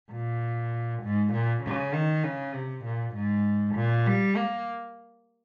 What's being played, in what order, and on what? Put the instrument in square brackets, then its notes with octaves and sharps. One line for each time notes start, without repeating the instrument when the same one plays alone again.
[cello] A#2
G#2
A#2
C#3
D#3
C#3
C3
A#2
G#2
A#2
G3
A#3